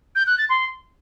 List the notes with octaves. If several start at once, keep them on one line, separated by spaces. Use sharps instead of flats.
G6
F#6
A6
C6